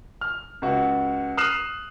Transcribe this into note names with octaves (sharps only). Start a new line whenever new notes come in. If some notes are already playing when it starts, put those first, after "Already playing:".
F6
C#2 F#4
D#6 F6 F#6 C7 E7